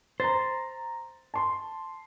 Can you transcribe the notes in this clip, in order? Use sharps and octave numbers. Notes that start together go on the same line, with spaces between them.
C5 A#5 A6
A5 C6